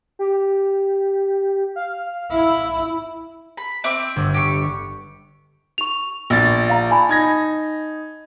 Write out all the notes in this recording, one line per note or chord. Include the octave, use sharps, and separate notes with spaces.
G4
F5
E4
B5
C4 E5 D6
G1
G4 C#6
C#6 F7
A#1 A6
F5 A#5
G#5 A5 B5
D#4 G#6 A#6